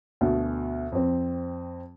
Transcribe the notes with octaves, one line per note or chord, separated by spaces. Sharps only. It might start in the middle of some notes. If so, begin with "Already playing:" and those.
D2 B2
F2 C4